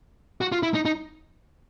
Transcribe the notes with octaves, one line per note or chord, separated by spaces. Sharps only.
F#4
F4
E4
D#4
D#4